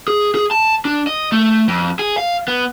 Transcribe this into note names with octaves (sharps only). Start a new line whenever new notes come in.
G#4
G#4
A5
D4
D#5
A3
F2
G#4
F5
B3